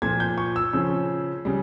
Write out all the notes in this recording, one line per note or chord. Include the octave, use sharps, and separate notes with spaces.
A#2 F3 G#6
G6
C#6
E6
C#3 F3
C#3 G3